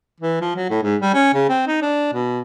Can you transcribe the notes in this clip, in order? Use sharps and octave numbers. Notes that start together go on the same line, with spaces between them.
E3
F3
F#3
A2
G#2
G3
C#4
C#3
C4
D#4
D4
B2